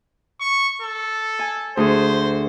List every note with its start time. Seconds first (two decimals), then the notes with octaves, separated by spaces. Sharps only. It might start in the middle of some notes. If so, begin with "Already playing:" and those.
0.41 C#6
0.82 A4
1.39 G#5
1.77 D2 G#4 C5